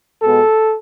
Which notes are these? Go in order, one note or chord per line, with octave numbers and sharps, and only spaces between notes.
B2 G#3 B3 A4